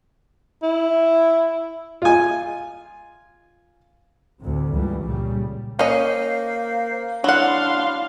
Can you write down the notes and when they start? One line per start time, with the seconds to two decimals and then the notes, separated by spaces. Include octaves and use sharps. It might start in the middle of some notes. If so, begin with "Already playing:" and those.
0.63 E4
2.02 F4 G#5
4.40 D2 A2 C3
4.73 C#2 G2 A#2 E3 G3
5.05 A#2 C#3 G3
5.79 A#3 C#4 C5 D#5 F5
7.24 F#3 D4 E4 F5 F#5 C6